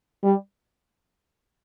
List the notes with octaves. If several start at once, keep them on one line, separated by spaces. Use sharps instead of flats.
G3